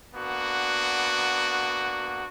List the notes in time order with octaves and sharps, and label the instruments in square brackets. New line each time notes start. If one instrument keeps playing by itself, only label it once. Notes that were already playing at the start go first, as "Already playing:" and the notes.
[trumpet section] A#3 B3 D4 F#4